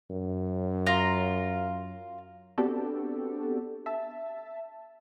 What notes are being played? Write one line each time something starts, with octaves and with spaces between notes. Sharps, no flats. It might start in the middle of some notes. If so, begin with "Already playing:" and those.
F#2
F4 A#5
B3 C4 D4 F#4 G4 A4
E5 A5